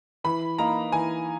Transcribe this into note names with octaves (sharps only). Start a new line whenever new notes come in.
E3 B5
A#3 D#4 A#5
E3 G#5